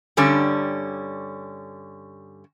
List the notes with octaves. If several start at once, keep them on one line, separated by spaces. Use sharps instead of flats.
G2 D3 G3 C#4